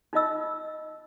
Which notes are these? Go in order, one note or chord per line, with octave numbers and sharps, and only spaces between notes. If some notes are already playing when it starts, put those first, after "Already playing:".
D#4 F4 D#5 E6